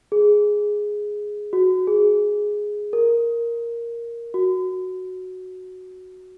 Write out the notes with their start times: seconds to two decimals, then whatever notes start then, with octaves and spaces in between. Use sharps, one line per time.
0.12 G#4
1.53 F#4
1.87 G#4
2.93 A#4
4.34 F#4